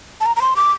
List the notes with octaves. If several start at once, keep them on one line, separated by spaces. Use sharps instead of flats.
A5
A#5
A#5
C6
D6